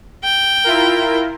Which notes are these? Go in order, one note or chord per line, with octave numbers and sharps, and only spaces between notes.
G5
E4 F4 A#4